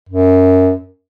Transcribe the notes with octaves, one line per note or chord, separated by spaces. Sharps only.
F#2